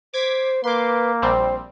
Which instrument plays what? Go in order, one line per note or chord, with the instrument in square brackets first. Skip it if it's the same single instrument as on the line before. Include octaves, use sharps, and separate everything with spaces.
[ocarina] C5 [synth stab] D6 G#6 B6
[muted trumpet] A#3 [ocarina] B4 [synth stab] C6 D6
[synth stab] A#1 G3 C4 [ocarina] C5